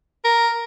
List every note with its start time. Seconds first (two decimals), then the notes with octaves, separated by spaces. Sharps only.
0.24 A#4